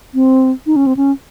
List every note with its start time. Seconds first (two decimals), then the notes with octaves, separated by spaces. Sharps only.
0.15 C4
0.66 D#4
0.76 C#4
0.87 C4
0.97 C#4